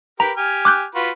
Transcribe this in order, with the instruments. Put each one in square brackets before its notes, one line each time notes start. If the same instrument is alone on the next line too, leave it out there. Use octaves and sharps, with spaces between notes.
[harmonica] G4 A#4 B4 [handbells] A#5
[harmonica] G4 G#5 F6
[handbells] D6 F#6 G6
[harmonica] F4 F#4 B4